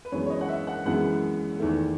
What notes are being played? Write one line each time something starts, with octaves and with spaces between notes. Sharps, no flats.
B4
F#2 E3 G#3 B3 C#5
C#5
D#5
F#5
E5
F#5
F#2 E3 G#3 B3 F#5
E2 D#3 A3